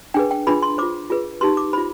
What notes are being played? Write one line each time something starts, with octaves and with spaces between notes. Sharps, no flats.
D4 G#4 B4 G5
G5
D4 F4 G#4 B4 B5
C6
F4 C5 D6
F4 G#4 B4
D#4 G4 B4 C6
D6
F4 C5 B5